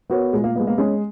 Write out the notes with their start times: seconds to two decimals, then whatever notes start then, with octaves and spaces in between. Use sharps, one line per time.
0.10 B3 F#4 A#4 C#5
0.33 A#2 G#3
0.44 A#3
0.55 A#3 B3
0.60 G#3
0.67 A#3
0.78 G#3 C#4